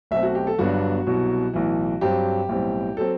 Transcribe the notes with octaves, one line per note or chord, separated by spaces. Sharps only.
B1 B2 A3 C4 E5
F#4
G4
A4
G1 G2 F#3 B3 D4 F#4
C2 B2 F#3
B1 A2 E3
G2 F#3 C4 G4
B1 A2 G3 C4
F#3 C4 A4